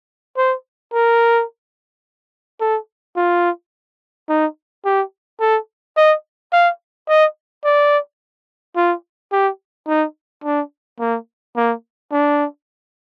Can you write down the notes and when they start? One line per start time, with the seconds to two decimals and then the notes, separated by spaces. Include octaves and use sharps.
0.37 C5
0.93 A#4
2.60 A4
3.17 F4
4.29 D#4
4.85 G4
5.40 A4
5.97 D#5
6.52 F5
7.08 D#5
7.64 D5
8.76 F4
9.32 G4
9.88 D#4
10.44 D4
11.00 A#3
11.56 A#3
12.12 D4